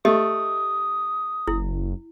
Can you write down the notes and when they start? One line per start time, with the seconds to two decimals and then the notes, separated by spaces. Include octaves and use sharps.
0.05 A3 G4 D#5 D#6
1.47 F#1 E4